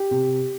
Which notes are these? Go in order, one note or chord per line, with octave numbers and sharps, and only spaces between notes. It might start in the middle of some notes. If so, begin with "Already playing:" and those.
Already playing: G4
C3